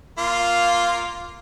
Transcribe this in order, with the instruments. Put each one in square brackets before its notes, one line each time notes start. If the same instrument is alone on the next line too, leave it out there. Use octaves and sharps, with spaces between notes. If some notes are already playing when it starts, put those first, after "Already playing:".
[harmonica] A#3 F4